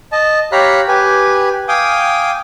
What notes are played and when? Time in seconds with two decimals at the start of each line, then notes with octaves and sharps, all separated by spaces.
0.12 D#5 A5
0.52 G4 C#5 F5 A#5 B5 F#6
0.88 G4 B4 G#5
1.68 F5 G5 G#5 D6 D#6